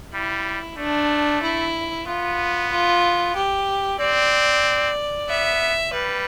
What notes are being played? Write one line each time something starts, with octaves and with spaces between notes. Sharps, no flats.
G3 E4
A3 D4
E4
B3 F4
F4
G4
C4 D5
B3 E5
G3 B4